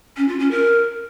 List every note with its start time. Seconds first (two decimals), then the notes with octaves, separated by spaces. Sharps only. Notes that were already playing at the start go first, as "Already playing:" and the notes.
0.17 C#4
0.28 F4
0.40 C#4
0.51 A#4